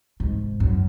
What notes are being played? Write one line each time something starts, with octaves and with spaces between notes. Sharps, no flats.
G#2
F#2